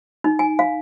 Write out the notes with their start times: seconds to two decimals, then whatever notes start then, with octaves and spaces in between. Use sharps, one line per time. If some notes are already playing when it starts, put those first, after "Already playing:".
0.24 D#4
0.39 G#5
0.59 F5